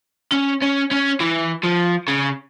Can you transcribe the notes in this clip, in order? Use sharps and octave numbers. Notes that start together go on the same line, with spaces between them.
C#4
C#4
C#4
E3
F3
C#3